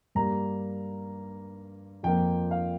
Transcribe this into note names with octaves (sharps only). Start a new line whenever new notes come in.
G2 G3 A#3 A#5
F2 F3 A#3 G5
F5